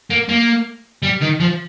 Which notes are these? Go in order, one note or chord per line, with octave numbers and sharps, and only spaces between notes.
A#3
A#3
G3
D#3
F3